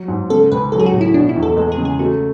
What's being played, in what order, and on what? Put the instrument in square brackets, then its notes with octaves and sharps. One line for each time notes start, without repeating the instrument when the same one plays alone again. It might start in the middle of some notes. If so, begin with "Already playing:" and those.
Already playing: [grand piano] F#3
G#2
[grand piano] C#3 [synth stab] A4
[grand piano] C#2 [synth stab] B4
[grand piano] F#3 [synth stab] A4
[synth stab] G#4
F#4
[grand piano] A2
[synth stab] E4
[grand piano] B2 [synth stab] D4
[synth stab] E4
[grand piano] E2
[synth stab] A4
[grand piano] G#3 [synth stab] A4
[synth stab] G#4
[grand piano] C#3
[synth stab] G#4
[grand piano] A3 [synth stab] F#4